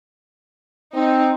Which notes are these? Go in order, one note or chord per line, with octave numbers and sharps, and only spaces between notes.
C4 D#4